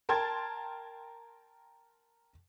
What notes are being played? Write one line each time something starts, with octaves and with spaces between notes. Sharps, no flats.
A#4 G5 A5 C6 G#6 A6